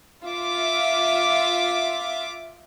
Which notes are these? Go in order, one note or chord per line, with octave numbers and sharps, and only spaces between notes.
F4 E5 D6